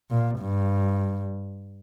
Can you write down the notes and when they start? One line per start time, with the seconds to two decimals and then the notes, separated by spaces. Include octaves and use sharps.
0.11 A#2
0.39 G2